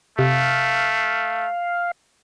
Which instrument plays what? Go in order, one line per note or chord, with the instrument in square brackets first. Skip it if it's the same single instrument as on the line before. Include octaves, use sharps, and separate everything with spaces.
[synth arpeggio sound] C3 [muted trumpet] A3 [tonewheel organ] F5